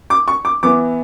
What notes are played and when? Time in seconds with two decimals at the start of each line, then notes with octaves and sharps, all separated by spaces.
0.10 D6
0.28 C#6
0.45 D6
0.63 E3 B3 E4 D6